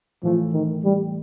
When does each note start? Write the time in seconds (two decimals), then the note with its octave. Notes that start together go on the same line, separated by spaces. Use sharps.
0.23 A2 E3 F3 A3
0.53 D#3
0.84 G3